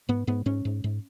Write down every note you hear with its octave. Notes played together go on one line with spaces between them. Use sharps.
G#2 B3
G#2 B3
G#2 C#4
G#2
G#2